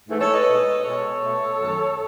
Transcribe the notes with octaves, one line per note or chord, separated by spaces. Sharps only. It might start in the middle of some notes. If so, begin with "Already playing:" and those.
G#2 E3 A3
A4 C#5
B4 D#5
B2 G#3
B2 G#3 A4 C#5
B2 A3
F#2 D#3 F#3 A3